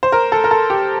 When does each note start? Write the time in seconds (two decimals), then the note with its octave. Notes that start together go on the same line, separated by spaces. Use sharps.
0.03 C5
0.12 A#4
0.32 A4
0.44 A#4
0.51 A4
0.70 G4